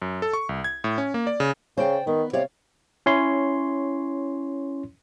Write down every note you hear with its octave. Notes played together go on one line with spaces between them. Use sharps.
F#2
A4
C#6
C2
G#6
A2
C#4
A#3
D5
C#3
C#3 C5 D5 G5
D#3 B3
C3 C#5 D5 F5
C#4 E4 C#5 C6